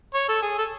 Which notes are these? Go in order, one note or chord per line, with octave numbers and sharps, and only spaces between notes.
C#5
A4
G#4
A4